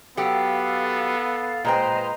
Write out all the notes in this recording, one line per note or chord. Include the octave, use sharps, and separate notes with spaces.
F#3 B3 G4 A4 F5
A#2 G#3 B4 C5 D#5 G5 A#5